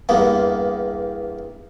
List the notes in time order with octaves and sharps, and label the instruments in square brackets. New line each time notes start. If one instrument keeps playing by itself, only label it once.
[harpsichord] E2 G2 A#3 B3